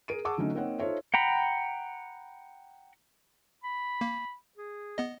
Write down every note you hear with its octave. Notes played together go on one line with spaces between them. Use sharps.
G#4 A#4 D7 D#7
G#4 F#5 A5 C#6 D6 E6
D3 F#3 A3 C#4 D#4
A#3 C4 D#4 C#5 F#5
D#4 F4 A4 C5 C#5 E5
F#5 G5 A#5 B5
B5
A#3
G#4
B3 D#5